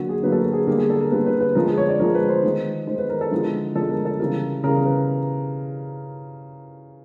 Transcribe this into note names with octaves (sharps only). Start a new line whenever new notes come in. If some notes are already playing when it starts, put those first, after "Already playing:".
Already playing: D3 F#3 A#3 F#4
G#4
D3 F#3 A#3 B4
A4
A#4
G#4
D3 G3 A#3 G4
G#4
A4
A#4
D3 G3 A#3 B4
B4
B4
D3 F3 G#3 A#4
G#4
C#5
D5
D3 F3 G#3 A#4
B4
C5
D#3 G#3
D#3 G#3 C5
B4
A#4
A4
D3 F3 G#3 E4
D3 F3 G#3 A4
A#4
A4
C#3 E3 G3 A#4
C#3 E3 G3 A#4
B4